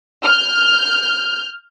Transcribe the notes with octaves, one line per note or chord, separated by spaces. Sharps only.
F6 G6